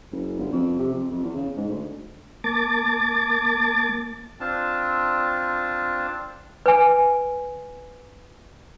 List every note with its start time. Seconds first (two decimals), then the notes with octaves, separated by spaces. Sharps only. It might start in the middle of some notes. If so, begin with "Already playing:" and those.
0.12 F#1
0.38 G1
0.52 F2
0.79 C3
0.93 F2
1.10 F2
1.23 E2
1.36 C#3
1.57 G#2
1.69 D2
2.44 A#3 A5 D6 A6
4.40 C4 D4 F4 A5
6.66 B4 G#5